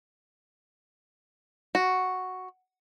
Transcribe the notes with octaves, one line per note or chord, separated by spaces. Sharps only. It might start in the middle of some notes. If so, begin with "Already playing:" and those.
F#4